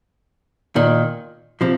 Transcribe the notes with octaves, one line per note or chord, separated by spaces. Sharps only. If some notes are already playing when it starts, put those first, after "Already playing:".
A#2 D#3
C3 F3